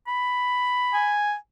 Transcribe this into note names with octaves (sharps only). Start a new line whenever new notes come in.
B5
G#5